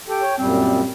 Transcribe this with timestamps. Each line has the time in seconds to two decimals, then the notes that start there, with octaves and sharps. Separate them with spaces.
0.08 G4 A4 G5
0.22 C#5
0.38 F#2 A#2 G3 C4